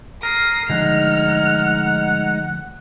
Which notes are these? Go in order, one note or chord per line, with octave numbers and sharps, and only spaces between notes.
A#4 D#6 C7
D3 F3 G#3 A3 D#4 F#5 F6